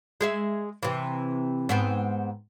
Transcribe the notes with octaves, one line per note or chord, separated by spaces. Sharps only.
G#3 G#4 E5
C3 E3
G#2 B3 C4